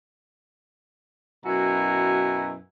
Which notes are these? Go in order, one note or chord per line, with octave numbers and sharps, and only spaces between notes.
F#2 B2 E4 F#4 G#5 A#5